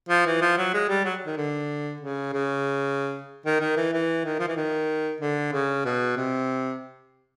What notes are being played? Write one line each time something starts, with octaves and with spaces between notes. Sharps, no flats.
F3
E3
F3
F#3
G#3
G3
F#3
D#3
D3
C#3
C#3
D#3
D#3
E3
E3
D#3
F3
E3
D#3
D3
C#3
B2
C3